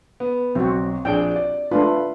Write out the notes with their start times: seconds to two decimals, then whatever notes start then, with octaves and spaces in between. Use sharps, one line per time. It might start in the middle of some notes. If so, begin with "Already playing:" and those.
0.20 B3
0.55 B1 C4 F#4
1.05 A#1 D4 G#4 G5
1.36 D5
1.71 A3 D4 F4 B4